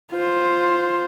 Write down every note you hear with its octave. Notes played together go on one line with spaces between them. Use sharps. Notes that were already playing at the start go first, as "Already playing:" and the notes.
F4 C5